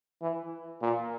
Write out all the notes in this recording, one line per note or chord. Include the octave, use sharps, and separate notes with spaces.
E3
A#2